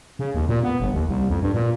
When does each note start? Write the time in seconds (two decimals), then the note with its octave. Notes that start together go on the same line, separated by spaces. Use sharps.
0.19 C#3
0.35 D#2
0.49 A#2
0.63 B3
0.80 G1
0.94 D#2
1.09 C2
1.29 F2
1.42 G2
1.54 A#2